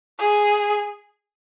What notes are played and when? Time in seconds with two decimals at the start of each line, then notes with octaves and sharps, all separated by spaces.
0.19 G#4